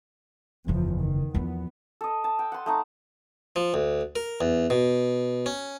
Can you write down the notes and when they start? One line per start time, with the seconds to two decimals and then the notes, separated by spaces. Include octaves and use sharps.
0.68 F#1 E2 C#3 F3
1.01 D#3
1.34 E2 F3 B3
2.01 A4 D#5
2.24 A5
2.39 G5
2.52 F#5 C6
2.66 A3 D#4 A5
3.56 F3
3.74 D2
4.16 A#4
4.41 E2
4.70 B2
5.46 C#4